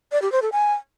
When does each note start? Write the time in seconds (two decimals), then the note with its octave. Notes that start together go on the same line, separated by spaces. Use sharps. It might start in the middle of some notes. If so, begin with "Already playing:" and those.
0.12 D5
0.22 G4
0.32 C5
0.42 A4
0.52 G#5